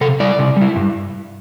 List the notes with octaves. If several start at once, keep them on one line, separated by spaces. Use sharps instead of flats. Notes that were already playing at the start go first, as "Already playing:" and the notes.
C3 A4
G3 E4 D5
C3
G3 E4
G2